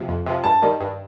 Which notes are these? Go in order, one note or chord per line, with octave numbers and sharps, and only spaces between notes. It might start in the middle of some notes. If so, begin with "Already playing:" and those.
Already playing: C3 F3
F2
C3 F3
G2 A5
D#3 G3
G2